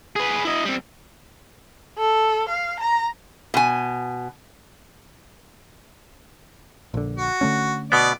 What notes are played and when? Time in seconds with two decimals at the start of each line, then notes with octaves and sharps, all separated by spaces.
0.16 G#4 B4
0.45 E4 D#5
0.65 G3 C4
1.98 A4
2.49 F5
2.80 A#5
3.54 B2 G#5
6.94 A#1 D3
7.18 F#4
7.41 D3 A3 C#4
7.92 B2 B3 D5